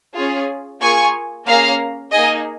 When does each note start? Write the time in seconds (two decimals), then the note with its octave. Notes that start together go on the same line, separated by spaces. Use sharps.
0.14 C#4 F4 G#4
0.80 A#3 F4 G#4 G#5 C#6
1.46 A#3 C#4 G#4 F5 A#5
2.12 A#3 D#4 G#4 D#5 G#5